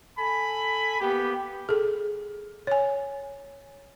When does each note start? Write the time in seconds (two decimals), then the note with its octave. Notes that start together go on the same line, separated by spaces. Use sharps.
0.18 A4 G#5 B5
1.00 A#3 B3 G4
1.69 G#4 A4
2.67 C#5 G#5